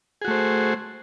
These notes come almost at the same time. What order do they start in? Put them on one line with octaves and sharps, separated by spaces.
G#4 F#4 A3 C5